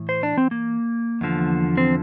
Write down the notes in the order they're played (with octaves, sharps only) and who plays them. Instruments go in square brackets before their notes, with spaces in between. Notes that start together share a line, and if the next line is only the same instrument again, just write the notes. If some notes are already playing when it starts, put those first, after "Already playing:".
Already playing: [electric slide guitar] A2 E3
C5
D4
C4
A#3
E2 D3 F3
C4